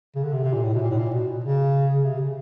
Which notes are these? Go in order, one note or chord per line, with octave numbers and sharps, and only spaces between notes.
C#3
D3
C3
C3
A#2
A2
B2
A#2
A2
A#2
B2
C#3
C#3
C3
C#3